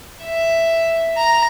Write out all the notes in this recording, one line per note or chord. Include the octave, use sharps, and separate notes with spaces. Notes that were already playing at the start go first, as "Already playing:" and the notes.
E5
A#5